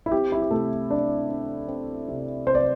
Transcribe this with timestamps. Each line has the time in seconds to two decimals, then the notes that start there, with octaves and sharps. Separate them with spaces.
0.06 E4
0.12 C4 G4
0.32 E4
0.42 G4
0.51 C3 A3 A4
0.90 C4 D4 D5
1.29 C4
1.68 C4
2.08 C3
2.47 C3 C5
2.55 D5